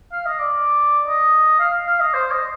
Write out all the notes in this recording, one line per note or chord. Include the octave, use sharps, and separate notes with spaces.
F5
D#5
D5
D#5
F5
F5
D#5
C5
D#5